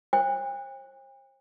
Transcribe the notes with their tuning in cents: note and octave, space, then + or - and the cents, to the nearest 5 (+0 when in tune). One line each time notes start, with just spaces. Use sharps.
C5 +45 G5 +45